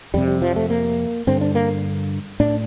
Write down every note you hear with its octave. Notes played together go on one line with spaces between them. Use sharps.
F2 C3 G3
G3
F3
A3
A#3
G2 D3 C4
D4
A#3
A2 D4